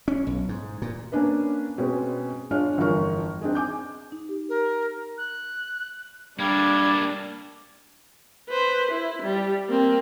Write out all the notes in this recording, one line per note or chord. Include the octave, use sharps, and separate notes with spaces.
C#4
B1
G#2
A#2
A#3 C#4 D4 B4
B2 G#3 C4 C#4 G#4 B4
G#3 D4 F4 C#5 F5 F6
G1 F2 E3 A#4 C#6 F6
C4 D4 D#4 G#4
G#5 D6 G6
D#4
G4
A#4
F#6
G3 A#3 D4 A4 G#6
B4 C5
E4
G3
A#3 C4